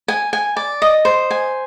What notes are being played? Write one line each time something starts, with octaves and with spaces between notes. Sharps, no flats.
G#5
G#5
D5
D#5
C5
G#5